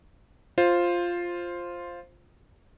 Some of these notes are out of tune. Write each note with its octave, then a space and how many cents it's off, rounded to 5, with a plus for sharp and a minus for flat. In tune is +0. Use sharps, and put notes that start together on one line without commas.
F4 +0 C5 +10